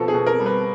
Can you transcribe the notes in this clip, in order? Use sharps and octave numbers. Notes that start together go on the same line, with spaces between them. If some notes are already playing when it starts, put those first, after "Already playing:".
Already playing: B2 F3 A4
G#4
B2
A#4
G3
B4